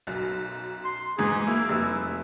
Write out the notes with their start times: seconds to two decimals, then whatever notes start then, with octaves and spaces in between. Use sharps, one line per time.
0.07 B1 F#2
0.85 C6
1.18 E2 G#2 G#3 G#4
1.47 A#3 E4
1.69 F1 G3 E6